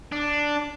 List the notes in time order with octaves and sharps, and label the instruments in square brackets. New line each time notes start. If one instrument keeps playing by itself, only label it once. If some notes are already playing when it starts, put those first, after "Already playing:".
[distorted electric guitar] D4